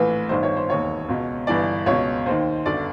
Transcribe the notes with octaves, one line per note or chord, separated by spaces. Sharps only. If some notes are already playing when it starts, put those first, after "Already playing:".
Already playing: A#1 A2 E3 B4
G1 G2 D#3 C5
C#5
C5
E1 D#2 D#3 C#5
C#2 B2
G1 G2 E3 D5
C#2 B2 C#5
D#2 D#3 C5
G1 F#2 D3 D5